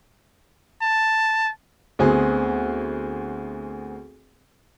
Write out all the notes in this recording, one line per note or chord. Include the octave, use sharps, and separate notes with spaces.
A5
D2 B3 C4 G#4